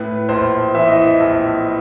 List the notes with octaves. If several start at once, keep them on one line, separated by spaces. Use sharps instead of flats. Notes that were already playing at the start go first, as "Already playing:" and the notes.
Already playing: A2 B4
A#1 C5
E3 E5
D#5
E5
A#1